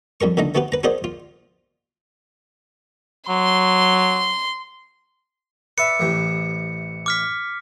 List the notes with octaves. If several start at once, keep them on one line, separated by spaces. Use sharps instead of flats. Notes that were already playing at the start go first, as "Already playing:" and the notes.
F2 G3 A#4 C#6
C#2 D3 A3 D#4 D#5 A#5
A3 B3 F#4 G4 B4
B4 A#5
F#4 G#4 A#4 C5 D5 D#5
F4
F#3 C6
B4 D5 E5 C#7
A1 C3 E3
D6 F6 B6